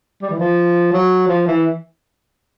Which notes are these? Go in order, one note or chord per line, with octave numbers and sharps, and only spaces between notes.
G3
E3
F3
F#3
F3
E3